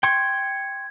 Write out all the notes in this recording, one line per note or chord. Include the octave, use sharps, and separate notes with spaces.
G5 C6 C#6 G#6